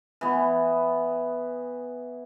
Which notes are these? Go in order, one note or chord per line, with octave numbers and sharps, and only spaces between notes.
E3 B3